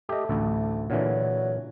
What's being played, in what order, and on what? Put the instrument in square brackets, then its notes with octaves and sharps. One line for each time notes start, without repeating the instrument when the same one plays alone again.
[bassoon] A3 [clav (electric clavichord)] G4 D#5
[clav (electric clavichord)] A1 D2 A4
[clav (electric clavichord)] A#2 D3 E3 [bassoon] F#3